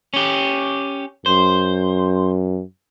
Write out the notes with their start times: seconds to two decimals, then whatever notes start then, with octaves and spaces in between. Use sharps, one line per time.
0.14 C#4 G4
1.26 F#2 C5